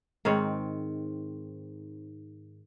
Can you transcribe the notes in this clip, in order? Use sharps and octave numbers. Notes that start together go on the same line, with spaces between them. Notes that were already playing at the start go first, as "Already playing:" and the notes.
G#2 D#3 C4 C#5